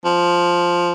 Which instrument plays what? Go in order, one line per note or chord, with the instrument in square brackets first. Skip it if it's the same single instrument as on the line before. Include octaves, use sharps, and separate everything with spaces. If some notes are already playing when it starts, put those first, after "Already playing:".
[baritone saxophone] F3